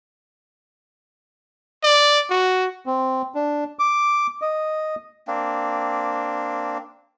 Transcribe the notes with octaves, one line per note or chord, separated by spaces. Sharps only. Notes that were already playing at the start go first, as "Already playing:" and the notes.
D5
F#4
C4
D4
D6
D#5
A#3 C4 D4